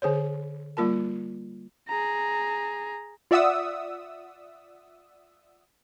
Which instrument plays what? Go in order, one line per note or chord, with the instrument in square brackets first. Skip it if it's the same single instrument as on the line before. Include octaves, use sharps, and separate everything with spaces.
[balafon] D3 G#4 C5 C#5
G3 A#3 F4 A#4 A5
[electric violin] G#4 A#5
[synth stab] F4 D5 E5 F#5 D#6 E6